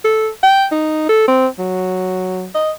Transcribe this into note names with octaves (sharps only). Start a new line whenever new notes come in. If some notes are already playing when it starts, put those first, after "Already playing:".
A4
G5
D#4
A4
C4
F#3
D#5